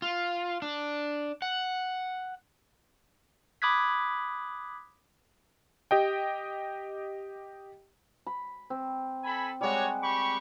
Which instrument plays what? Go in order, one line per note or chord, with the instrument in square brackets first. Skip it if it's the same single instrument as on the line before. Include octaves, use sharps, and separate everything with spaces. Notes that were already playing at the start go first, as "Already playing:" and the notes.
[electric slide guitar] F4
D4
F#5
[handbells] B5 D6 D#6 F#6 G#6 B6
[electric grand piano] G4 D#5 G5
[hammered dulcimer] B5
C4
[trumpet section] A4 G#5 B5
[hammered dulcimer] G3 G#3 F#5 [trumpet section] F#4 G4 C#5
[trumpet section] G4 B5 C#6